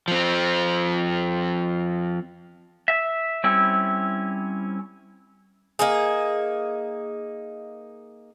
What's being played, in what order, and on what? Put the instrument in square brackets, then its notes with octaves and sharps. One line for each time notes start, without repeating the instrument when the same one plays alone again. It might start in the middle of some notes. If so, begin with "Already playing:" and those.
[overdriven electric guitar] F3 C4
[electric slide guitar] E5
G3 C4 C#4 E4
[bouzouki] A#3 D#4 G#4